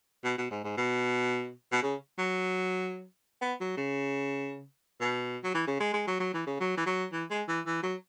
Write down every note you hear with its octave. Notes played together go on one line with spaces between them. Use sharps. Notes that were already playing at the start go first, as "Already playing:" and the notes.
B2
B2
G#2
G#2
B2
B2
C#3
F#3
B3
F#3
C#3
B2
F#3
E3
C#3
G#3
G#3
F#3
F#3
E3
C#3
F#3
E3
F#3
E3
G#3
E3
E3
F#3